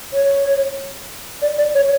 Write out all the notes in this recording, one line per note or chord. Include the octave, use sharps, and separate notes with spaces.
C#5
D5
D5
C#5